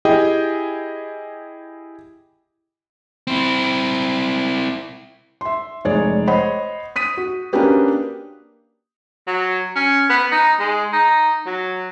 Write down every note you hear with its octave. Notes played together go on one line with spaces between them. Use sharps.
E4 G4 G#4 D#5 G5
C4 E4
E5 C6
F1 G#3 G#4 C#5 D5
C5 C#5 D#5 F#5 B5
D#6 B6 D#7
F#4
A#3 C#4 D4 F#4 G4 B4
F#3
C#4
B3
D#4
G#3
D#4
F#3